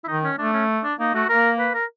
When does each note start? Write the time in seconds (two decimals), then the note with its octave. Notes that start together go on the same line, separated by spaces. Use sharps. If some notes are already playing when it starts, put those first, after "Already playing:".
0.04 E4
0.08 D#3 D#4
0.24 C#4
0.38 A3 D4
0.53 C#4
0.83 D4
0.99 A#3 D#4
1.14 A3 F#4
1.29 A#3 A#4
1.59 B4
1.74 A#4